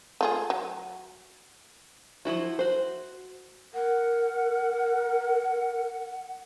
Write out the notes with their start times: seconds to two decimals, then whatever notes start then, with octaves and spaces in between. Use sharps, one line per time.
0.21 A3 F4 G#4
0.50 F#3
2.25 F3 F#3 E4 F#4
2.59 F#4 C5
3.74 A#4 F#5